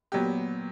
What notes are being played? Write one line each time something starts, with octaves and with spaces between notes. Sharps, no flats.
A#2 F#3 B3 G4